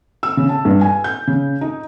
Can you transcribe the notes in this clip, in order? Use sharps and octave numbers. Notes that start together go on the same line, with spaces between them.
E6
C#3
A5
G2
G#5
G6
C#3
D#4